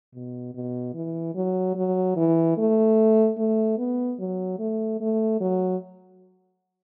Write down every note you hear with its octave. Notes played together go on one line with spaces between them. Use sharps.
B2
B2
E3
F#3
F#3
E3
A3
A3
B3
F#3
A3
A3
F#3